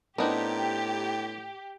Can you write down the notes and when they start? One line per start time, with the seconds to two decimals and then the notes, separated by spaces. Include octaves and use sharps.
0.18 A2 B3 C4 D4 D#4 G4 A#4